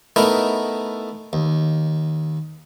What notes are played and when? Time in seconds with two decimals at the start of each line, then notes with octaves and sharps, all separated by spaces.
0.16 A3 B3 D#4 E4 A#4
1.33 D#2